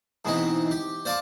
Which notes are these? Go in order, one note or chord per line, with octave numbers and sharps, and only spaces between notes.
G#2 B2 E3 C4 D#4
G4
C5 D5 F5 A5 C6 D6